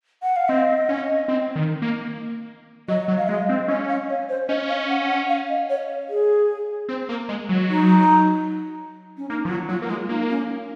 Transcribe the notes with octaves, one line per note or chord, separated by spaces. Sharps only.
F#5
F5
C4 D#5
C#4
C4
D#3
A#3
F#3 D#5
F#3
F5
G#3 D#5
C4
C#4 D#5
F5
C#5
C5
C#4 D#5
F5
F#5
F#5
F5
D#5
C#5
G#4
C4
A#3
G#3
F#3
D#4
C#4
A#3 D#4
F3
F#3 F4
F#3 F4
A#3
G#3 F4
A#3 D#4
C#4